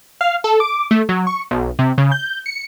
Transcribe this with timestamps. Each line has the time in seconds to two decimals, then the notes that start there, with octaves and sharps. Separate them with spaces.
0.21 F5
0.44 A4
0.60 D6
0.91 A3
1.09 F#3
1.27 C#6
1.51 B1
1.79 C3
1.98 C#3
2.12 G6
2.46 C#7